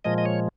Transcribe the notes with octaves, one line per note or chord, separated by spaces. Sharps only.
A#2 F3 G#3 D#5
D#5
C#5